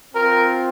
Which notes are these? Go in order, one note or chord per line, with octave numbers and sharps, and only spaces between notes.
C4 F4 A#4